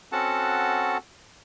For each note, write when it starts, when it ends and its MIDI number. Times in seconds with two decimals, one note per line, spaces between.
0.12 0.98 60
0.12 0.98 61
0.12 0.98 66
0.12 0.98 69
0.12 0.98 78
0.12 0.98 81